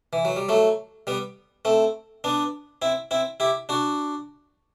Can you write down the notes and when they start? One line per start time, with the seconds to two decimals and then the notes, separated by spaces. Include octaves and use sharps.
0.13 E3
0.25 F#3
0.36 G3
0.49 F#3 A3
1.07 G3 B3
1.65 A3 C4
2.24 B3 D4
2.82 C4 E4
3.11 C4 E4
3.40 E4 G4
3.69 D4 F#4